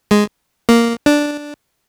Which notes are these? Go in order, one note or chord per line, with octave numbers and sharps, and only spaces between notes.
G#3
A#3
D4